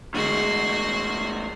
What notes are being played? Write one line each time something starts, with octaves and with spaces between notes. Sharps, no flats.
E2 A2 D3 G#3 F#4 C6